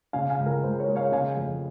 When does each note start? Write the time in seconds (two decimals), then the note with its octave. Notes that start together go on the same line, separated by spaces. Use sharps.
0.13 C#3 F5 G#5
0.30 F5 G#5
0.39 C#2
0.46 A#4
0.63 C#2 C5
0.79 A#4 C#5
0.88 G#3
0.96 C#5 F5
1.12 C#3 F5 G#5
1.37 F2